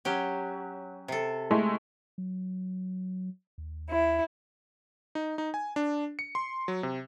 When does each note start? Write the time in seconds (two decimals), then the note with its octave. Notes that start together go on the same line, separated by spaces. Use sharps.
0.05 F#3 C#4 G4
1.08 C3 A4
1.51 G#3 A3 E4
2.18 F#3
3.58 D#2
3.90 E4
5.15 D#4
5.38 D#4
5.54 G#5
5.76 D4
6.19 C#7
6.35 C6
6.68 F#3
6.83 C3